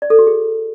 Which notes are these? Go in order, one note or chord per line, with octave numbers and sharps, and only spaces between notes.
D5
A4
F#4
G#4